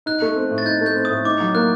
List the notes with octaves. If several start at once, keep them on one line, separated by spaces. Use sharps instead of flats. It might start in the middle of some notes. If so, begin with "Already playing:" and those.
D#4 F#6
A3
C4
A2
A6
D#4 G6
A3
G6
C4
D#6
A2
D#4 D6
F#3
A#3 F#6